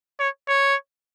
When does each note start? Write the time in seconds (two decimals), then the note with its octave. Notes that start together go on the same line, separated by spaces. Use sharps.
0.20 C#5
0.48 C#5